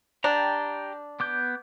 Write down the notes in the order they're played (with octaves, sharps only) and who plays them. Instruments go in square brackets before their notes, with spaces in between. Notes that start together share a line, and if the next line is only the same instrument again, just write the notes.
[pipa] D4 [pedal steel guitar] G4 G5 A#5
[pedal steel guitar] B3 D6 G6